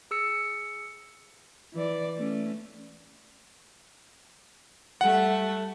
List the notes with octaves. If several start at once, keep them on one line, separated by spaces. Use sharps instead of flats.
G#4 E6 C#7
E3 D5
A3 C#4
G3 A3 F#5